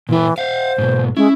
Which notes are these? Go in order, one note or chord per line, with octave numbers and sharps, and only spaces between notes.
A#2 E3 E4
C5 F5 F#5
G#2 B2
G#3 C#4 E4